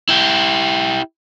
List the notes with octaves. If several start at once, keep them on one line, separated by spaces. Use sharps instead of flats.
E4 G4